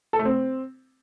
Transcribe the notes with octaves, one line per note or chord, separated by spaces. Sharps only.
A4
A3
C4